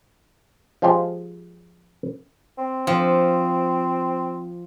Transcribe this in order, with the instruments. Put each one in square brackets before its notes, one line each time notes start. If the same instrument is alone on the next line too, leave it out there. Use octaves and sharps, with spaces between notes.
[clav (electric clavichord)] F3 G#3 F4 G4 C5
[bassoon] C4
[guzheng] F3 [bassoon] C4